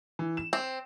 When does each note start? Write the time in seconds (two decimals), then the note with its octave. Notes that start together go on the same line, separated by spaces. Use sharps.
0.19 E3
0.37 E7
0.53 C4